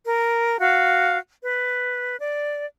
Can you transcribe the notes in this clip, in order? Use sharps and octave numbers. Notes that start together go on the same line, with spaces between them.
A#4
F#4 F5
B4
D5